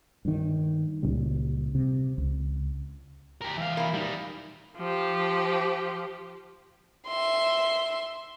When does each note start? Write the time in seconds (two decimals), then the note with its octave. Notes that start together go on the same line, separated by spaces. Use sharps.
0.25 G2 D#3
1.03 C#2 A#2 C#3 G3
1.75 C3
2.18 C#2
3.42 G4 A#4
3.57 E3 F5
3.77 A#3 E4
3.94 G3 D#4
4.77 F3 G4
7.08 E5 C6